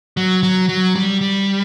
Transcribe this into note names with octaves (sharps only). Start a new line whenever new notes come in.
F#3
F#3
F#3
G3
G3